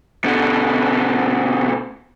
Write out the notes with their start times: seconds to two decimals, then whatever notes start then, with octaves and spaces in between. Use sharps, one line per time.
0.25 B2 D3